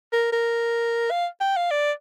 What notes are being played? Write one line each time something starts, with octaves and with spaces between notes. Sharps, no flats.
A#4
A#4
F5
G5
F5
D5